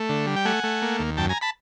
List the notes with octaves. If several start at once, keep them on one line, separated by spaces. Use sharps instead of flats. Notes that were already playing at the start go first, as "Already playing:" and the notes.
Already playing: A3
D3
G3
G5
A3 F#5 G#5
A3
A#3
D#2
F#2 G5 A5
G#5 A#5
A5 B5